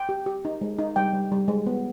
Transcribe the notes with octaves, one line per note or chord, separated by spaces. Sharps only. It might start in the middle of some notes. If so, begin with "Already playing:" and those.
Already playing: G5
G4
G4
D#4
G#3
D#4
G3 G5
G3
G3
G#3
B3